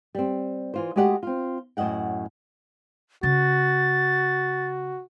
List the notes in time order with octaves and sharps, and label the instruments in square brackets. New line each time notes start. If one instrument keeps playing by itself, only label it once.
[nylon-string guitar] G3 C4
E3 F4 C5
G#3 A3 F#4 G4 D#5 F#5
C4 F4
F#2 A2 D#5 F#5 G5
[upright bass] C#3 [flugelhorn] F#4 [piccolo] A6